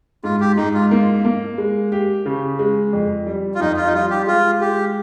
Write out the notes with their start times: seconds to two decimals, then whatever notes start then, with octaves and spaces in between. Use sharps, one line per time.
0.24 G#2 F4
0.40 G4
0.57 G#2 D#4
0.74 F4
0.91 A#3
1.24 A#3
1.58 G#3
1.92 G4
2.26 C#3
2.59 G#3
2.93 F2
3.26 G3
3.55 F4
3.60 F2 D#4
3.77 F4
3.87 D#4
3.94 G3 F4
4.10 G4
4.27 G#3 F4
4.61 G#3 G4